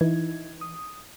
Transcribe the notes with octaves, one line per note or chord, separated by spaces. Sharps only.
E3 D#4 E4 G#6
D#6